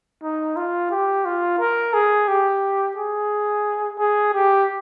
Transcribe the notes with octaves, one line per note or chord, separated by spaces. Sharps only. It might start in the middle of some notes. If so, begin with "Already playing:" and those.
D#4
F4
G4
F4
A#4
G#4
G4
G#4
G#4
G4